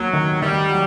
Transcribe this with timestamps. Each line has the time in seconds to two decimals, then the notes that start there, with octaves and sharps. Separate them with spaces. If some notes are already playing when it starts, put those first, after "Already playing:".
Already playing: D#2 F#3
0.13 D#3
0.41 D#3 G3
0.70 F#3